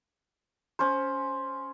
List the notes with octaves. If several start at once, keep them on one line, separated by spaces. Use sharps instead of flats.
C#4 C5